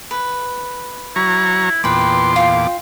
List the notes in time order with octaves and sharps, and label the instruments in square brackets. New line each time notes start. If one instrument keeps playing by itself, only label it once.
[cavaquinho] B4
[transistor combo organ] F#3 A#5 C#6 [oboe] E4
[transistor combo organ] E2 A#2 D6 [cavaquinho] B4 G5 [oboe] C6
[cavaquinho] F4 G5